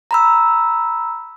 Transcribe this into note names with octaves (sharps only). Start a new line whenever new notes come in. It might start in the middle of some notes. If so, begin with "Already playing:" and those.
A#5 B5 E6